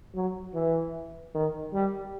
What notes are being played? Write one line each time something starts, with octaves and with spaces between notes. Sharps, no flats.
F#3
E3
D#3
G3